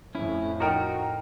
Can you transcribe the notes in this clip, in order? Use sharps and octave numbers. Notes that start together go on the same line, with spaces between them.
F2 A2 C#4 E4
F3 D#4 F#4 A#4 G5 A#5